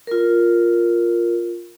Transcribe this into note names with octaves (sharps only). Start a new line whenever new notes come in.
F4 A#4